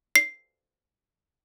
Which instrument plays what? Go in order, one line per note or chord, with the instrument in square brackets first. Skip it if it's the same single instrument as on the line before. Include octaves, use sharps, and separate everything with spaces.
[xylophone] C7